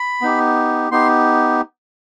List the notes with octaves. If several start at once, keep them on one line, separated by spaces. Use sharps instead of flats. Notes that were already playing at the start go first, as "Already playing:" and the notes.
Already playing: B5
B3 D#4 G4
B3 D#4 G4 C6